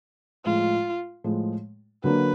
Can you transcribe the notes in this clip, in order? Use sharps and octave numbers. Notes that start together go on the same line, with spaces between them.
A2 F3 G#3 F4
A2 F3 G#3
D3 F#3 A#3 D4 B4